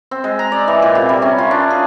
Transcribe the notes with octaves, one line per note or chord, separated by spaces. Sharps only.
C4
G#3
A#5
D5
E3
A#2
C3
G3
C#4
F4
D4
G#4